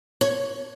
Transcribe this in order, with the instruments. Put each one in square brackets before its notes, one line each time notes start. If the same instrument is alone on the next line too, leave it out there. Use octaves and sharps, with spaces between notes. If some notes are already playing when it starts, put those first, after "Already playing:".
[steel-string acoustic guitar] C#5